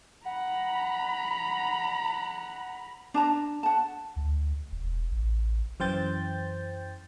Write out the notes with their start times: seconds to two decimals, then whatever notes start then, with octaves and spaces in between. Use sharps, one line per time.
0.26 F#5 A#5 B5
3.14 D4 A5 A#5
3.63 F#5 A5
4.16 D2
4.72 E1
5.11 A1
5.80 F#2 E3 C5 G5 G6 A6